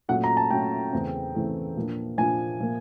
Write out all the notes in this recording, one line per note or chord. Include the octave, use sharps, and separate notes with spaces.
A#2 F#3 A3 C#4 F#5
A#5
A5
A#2 F#3 A3 C#4 G5
E2 C#3 E3 A3 C4
E2 C#3 E3 A3 C4
A#2 F3 A#3 D4
A#2 F3 A#3 D4 G#5
A#2 F3 A#3